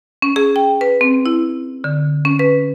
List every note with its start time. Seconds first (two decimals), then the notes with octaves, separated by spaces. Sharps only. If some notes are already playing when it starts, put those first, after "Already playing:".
0.22 C#4
0.36 G#4
0.56 G5
0.81 B4
1.01 C4
1.26 E4
1.84 D3
2.25 C#4
2.39 B4